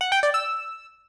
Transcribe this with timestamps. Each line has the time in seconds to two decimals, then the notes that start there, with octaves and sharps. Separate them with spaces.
0.01 F#5
0.12 G5
0.23 D5
0.34 E6